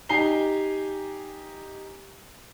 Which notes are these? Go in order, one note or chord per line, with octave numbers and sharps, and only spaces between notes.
D#4 G4 G#5 A#5 C7 G7